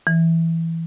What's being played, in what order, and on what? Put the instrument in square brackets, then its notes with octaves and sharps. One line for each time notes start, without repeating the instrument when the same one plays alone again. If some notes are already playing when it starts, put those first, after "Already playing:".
[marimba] E3